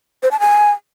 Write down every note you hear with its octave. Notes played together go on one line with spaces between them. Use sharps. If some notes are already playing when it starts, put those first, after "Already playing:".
C5
A5
G#5